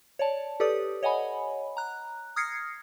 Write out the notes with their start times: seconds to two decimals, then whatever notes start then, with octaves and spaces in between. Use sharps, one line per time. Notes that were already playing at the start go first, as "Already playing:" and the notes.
0.19 C#5 D5 A5
0.60 G4 A4 B4 D5 D#6
1.03 C#5 D#5 F#5 G#5 B5
1.77 A#5 F#6
2.36 D#6 F6 G#6 A#6 C7 C#7